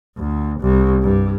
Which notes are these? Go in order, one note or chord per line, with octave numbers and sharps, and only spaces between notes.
D2
C2
G2